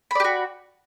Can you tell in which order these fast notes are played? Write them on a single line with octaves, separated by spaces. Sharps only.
B5 D5 G4 F#4